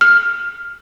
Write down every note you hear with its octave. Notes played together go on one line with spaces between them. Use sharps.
F6